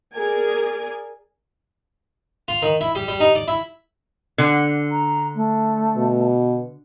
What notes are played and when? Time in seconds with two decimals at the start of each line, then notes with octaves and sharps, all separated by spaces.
0.14 G#4 A#4 D5 G#5
2.48 F4
2.62 D#3
2.81 E4
2.95 G3
3.08 G3
3.20 D#4
3.35 D5
3.48 E4
4.38 D3
4.92 A#5
5.35 A3
5.96 B2